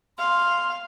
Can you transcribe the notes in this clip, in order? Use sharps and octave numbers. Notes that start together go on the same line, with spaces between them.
F5 C6